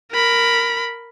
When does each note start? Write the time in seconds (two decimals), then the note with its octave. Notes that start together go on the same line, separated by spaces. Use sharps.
0.12 A#4 B5